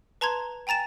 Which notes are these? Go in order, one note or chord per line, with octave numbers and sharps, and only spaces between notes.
B4 A5 A#5 C6 G#6
G5 G#5 A#5 A6 E7